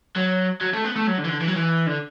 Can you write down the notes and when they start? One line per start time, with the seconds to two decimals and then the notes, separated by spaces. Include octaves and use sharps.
0.16 F#3
0.61 F#3
0.74 A3
0.85 B3
0.96 A3
1.07 F#3
1.18 D3
1.25 E3
1.29 D3
1.41 E3
1.48 F#3
1.56 E3
1.87 D3